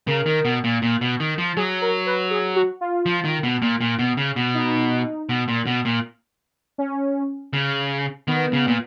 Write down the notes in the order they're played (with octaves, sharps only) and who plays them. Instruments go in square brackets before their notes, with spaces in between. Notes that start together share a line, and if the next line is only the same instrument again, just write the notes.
[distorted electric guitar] C#3 [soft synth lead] A#4
[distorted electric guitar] D#3
B2
A#2
A#2
B2
D#3
F3
[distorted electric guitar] F#3 [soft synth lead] G#4
[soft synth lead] A#4
B4
G#4
F#4
F4
[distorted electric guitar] F3
D#3
B2
A#2
A#2
B2
C#3
B2
[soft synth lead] D#4
[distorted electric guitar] B2
A#2
B2
A#2
[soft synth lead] C#4
[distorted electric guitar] C#3
[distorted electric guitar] D#3 [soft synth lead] B3
[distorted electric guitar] C#3
A#2